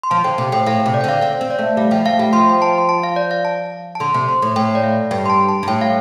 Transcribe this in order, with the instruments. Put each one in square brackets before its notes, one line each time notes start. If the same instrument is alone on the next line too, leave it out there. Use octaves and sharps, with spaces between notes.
[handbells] C6
[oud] F3 [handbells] A5
[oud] D3 [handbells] G5
[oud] C3 [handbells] G5
[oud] A2 [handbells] G5
[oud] A2 [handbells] F5
[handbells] G5
[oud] C3
[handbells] D5
G5
[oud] D3 [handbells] F5
[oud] C4 [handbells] F5
[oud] C4
[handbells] D5
[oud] A3
[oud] G3 [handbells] F5
[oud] F3 [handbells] G5
[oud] A3 [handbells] F5
[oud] G3 [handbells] G5
[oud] F3 [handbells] C6
[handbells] G5
A5
C6
A5
F5
D5
F5
A5
A5
[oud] D3 [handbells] C6
[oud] C3
[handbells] C6
[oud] A2
[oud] A2 [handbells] G5
[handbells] D5
F5
[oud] G2 [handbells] G5
[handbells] C6
A5
A5
[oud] G2
[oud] A2 [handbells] G5
[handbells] F5